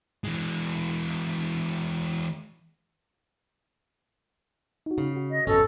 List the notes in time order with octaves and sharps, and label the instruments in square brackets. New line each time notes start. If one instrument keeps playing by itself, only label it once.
[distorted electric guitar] E3 G#3
[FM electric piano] D#4 F#4
[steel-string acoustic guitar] C#3
[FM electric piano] F#4
[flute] D#5
[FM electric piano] G#1 F2 [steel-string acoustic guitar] B2 C#4 [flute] A4